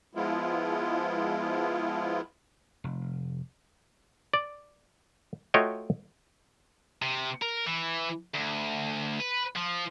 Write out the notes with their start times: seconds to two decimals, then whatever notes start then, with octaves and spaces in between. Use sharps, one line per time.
0.15 F3 G#3 B3 E4 F4
2.84 F1
4.34 D5
5.54 A3 F4 F#4 C#5 D#5 G5
7.02 C3
7.42 A#4
7.66 E3
8.34 D2
9.20 B4
9.56 F3